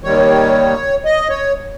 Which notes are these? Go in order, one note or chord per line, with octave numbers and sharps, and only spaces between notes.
D#2 D#3 G3 C#5
D#5
C#5